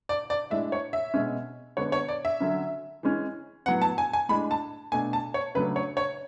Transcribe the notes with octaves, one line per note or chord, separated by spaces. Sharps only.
D5
D5
A2 G#3 D4 E5
C#5
E5
B2 G#3 C#4
D3 G#3 B3 D4 C#5
C#5
D5
E5
D3 F#3 C#4
E3 G#3 C#4
A2 F#3 B3 F#5
A5
G#5
G#5
A2 G#3 D4 B5
A5
B2 A3 D4 G#5
A5
C#5
C#3 F#3 A3 D4 B4
C#5
C#5